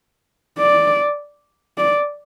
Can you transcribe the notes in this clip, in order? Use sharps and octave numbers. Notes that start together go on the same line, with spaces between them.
D5
D5